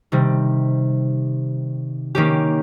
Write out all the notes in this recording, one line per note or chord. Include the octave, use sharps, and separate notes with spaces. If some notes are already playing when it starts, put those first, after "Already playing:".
C3 D#3 G3
D#3 A#3 C#4 G4